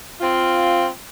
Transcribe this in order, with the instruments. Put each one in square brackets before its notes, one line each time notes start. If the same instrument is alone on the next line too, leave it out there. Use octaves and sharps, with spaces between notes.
[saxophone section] C4 F4